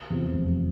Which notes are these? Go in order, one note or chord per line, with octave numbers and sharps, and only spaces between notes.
E2 C3 F3
F1